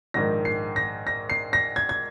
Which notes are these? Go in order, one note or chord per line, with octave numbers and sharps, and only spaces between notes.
A#1 G#2 D#3 A#6
C7
A#6
A#6
C7
A#6
G#6
G#6